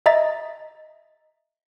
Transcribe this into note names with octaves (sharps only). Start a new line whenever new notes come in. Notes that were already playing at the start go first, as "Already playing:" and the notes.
D#5 E5 A#5 A6